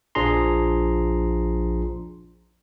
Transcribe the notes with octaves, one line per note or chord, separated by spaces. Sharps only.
A#1 F3 D4 G#4 A#5 C6